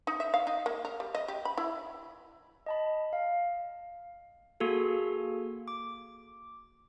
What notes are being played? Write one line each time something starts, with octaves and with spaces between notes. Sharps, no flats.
D#4
E5
F5
D#4
A#3
A#4
G3
D#5
G4
B5
E4
D#5 A5 B5
F5
A#3 F#4 G#4 A4
D6